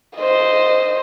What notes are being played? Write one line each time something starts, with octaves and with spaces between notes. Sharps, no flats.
C5 D#5